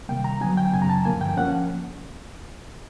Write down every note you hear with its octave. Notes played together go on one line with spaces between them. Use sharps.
C3 D#3 G3 A#3 G5
A#5
D3 F#3 B3 G#5
G5
F#2 C#3 F#3 G#5
A#5
A5
G2 D3 F3 A#3 G#5
G5
F3 A#3 C#4 F#5